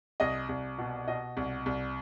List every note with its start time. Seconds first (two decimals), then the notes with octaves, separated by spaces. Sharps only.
0.20 C2 D#5
0.49 C2
0.78 B2
1.08 B2 D#5
1.37 C2
1.66 C2